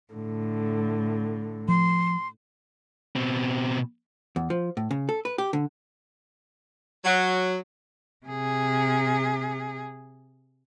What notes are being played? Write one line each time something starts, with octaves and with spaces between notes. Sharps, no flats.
A2 D3
F3 C6
B2 C4
E2
F3
A2
C#3
A4
B4
G4
D3
F#3
C3 G#4